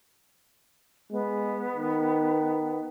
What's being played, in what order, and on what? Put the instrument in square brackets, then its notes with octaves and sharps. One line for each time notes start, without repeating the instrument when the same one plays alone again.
[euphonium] G#3 [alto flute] B3
[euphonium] D#3